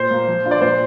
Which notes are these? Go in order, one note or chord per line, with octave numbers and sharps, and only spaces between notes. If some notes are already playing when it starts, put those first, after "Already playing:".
Already playing: A#2 C5
A#3 F4
F3
D4 F4
D5
A#2 C5